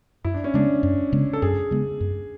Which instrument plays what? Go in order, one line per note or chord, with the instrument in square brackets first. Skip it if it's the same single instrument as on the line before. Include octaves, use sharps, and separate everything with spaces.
[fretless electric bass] F#2 [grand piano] E4
[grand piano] D4
C#4
[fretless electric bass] C#3 G#3 B3 [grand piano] D4
[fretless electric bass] F#2
C#3 G#3 B3
[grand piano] A4
[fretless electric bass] F#2 [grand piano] G#4
[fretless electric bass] C#3 G#3 B3
F#2